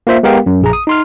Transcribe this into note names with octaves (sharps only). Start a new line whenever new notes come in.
A#3 F4 C5 E5
G#3 B3 G4 A#4 F5 G5
F#2
A#1 G#4 A#5
D#6
D#4 C6 F6